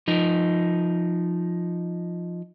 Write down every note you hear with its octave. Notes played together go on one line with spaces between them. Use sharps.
F3 D#4